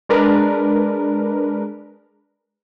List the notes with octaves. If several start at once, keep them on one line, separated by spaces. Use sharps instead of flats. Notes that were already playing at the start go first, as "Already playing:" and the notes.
G#3 D4 A#4 B4